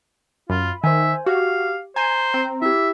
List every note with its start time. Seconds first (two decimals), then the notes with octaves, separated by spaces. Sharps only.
0.50 F#2 F4 B5
0.84 D#3 C5 E5 G#5
1.26 F#4 G4 F5
1.96 C5 G#5 A#5
2.34 C4
2.62 E4 G4 E5